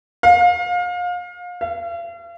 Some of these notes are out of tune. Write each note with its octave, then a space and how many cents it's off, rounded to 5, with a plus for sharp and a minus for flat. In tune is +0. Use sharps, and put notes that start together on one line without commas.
F5 +30
F5 -40